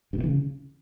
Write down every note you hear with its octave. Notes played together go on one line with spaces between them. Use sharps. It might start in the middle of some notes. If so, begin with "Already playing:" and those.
G2
A#2
E3
C#3